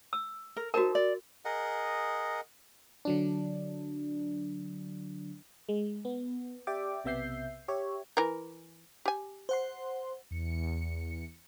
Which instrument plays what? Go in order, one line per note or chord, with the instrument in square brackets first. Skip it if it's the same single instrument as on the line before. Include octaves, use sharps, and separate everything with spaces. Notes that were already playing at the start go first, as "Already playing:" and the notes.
[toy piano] E6
[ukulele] A#4
[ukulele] D#4 C5 A5 [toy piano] F#4 A#4
[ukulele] D5
[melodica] G#4 A#4 D#5 F#5
[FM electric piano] D3 F#3 D4
G#3
B3
G4 D5 E5 G5 D6
B1 C3 B3 E5 G6 C7
G4 C#5 E5
[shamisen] E3 A#4
G4 G#5
[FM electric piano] C5 F#5 C6
[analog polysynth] E2 C#7